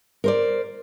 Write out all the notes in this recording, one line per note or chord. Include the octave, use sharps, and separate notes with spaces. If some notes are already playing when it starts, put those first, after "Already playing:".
A#4 C5 D5